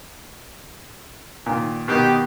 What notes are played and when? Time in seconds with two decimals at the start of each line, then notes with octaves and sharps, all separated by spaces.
1.46 A#2 D#3
1.88 B2 D#3 D#4 G4